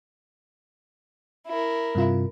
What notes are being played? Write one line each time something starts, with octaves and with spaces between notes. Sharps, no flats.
E4 A#4
G2 C3 F4